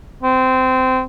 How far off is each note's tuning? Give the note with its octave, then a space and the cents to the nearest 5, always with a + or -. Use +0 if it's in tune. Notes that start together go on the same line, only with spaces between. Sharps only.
C4 -20